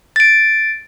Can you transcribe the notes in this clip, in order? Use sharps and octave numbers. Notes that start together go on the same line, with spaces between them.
A6 D7